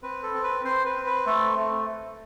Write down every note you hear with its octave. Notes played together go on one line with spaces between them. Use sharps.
C4 B4
A4
C4
B4
C4 C5
B4
C4
B4
A3 A4
A3